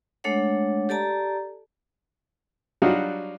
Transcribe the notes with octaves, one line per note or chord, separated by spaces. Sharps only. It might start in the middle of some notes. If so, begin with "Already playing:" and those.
G#3 A3 D4 A4 C#5 F#5
G4 A4 D5 A5 A#5
F#3 G3 D4 D#4 F4 F#4